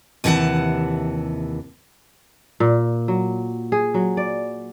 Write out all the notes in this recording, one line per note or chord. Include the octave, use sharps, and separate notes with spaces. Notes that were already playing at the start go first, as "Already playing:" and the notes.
D#2 C3 E3 D#4 F#5 A5
A#2
F#3
G#4
F#3
D5